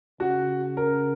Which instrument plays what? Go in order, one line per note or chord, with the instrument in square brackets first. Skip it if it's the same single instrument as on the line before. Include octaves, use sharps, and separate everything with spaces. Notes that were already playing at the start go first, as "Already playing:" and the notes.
[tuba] C#3 [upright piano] F#4
[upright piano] A#4